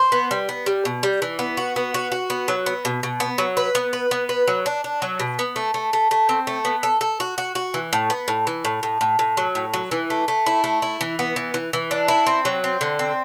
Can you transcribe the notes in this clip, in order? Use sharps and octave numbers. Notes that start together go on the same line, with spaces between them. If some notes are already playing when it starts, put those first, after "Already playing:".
Already playing: C5
B3
G3
B3
G3
B2
G3
E3
B3
F#4
B3
F#4
F#4
B3
F#3
B3
B2
B2
B3
F#3
B4
B3
B4
B3
B4
F#3
D4
D4
F#3
B2
B3
A3
A3
A3
A3
C4
A3
B3
A4
A4
F#4
F#4
F#4
E3
A2
B3
A2
E3
A2
A2
A2
A2
F#3
A2
F#3
E3
A3
A3
E4
A3
E4
E3
B3
E3
E3
E3
D4
E4
C4
F#3
C4
D3
C4